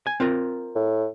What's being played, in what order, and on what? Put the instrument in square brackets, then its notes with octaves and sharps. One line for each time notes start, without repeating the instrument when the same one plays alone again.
[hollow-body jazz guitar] G#5
C4 F4 A#4
[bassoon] A2